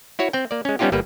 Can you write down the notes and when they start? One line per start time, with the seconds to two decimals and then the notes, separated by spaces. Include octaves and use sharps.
0.19 E4 F#4 C#5
0.33 C4 G5
0.51 A#3 D5
0.65 G#3 C#4
0.79 G3 B3 C#4 D#4 F4 G4
0.92 G1 G3 A#3 B4